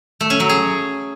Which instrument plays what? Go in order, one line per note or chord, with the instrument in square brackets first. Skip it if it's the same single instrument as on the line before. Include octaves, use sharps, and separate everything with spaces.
[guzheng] A3
C#4
F#3
G#4